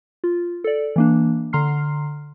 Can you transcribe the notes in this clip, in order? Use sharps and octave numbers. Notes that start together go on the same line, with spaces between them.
F4
A4 D5
E3 A#3 D4
D3 A#5 C6 F6 C7